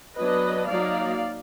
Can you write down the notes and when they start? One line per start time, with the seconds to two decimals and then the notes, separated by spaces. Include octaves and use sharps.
0.17 F#3 B3 D4 B4 D#5
0.67 F#3 A#3 D#4 D5 F5